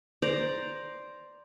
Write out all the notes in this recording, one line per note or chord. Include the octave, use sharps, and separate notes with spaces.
C5 D5 A#5